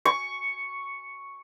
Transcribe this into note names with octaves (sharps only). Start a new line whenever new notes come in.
C#6